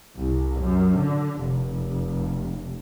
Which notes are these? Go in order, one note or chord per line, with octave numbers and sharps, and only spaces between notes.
C2
F#2
D3
F1